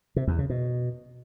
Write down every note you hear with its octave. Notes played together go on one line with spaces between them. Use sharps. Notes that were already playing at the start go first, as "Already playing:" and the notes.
C3
E2
C#3
B2